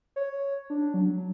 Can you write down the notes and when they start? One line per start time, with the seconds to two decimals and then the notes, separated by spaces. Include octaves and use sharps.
0.16 C#5
0.70 D4
0.94 F#3